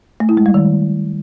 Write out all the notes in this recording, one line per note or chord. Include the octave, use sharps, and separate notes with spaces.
A3
E4
G#3
G3
D#3